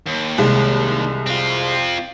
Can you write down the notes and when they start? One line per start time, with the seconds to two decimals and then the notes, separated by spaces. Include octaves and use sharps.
0.06 D#2
0.38 C2 G#3
1.26 C4 F4